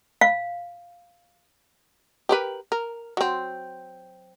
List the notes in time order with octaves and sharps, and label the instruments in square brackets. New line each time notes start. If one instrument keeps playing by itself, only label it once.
[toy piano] F5
[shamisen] G4 A#4 B4
A#4
F#3 C4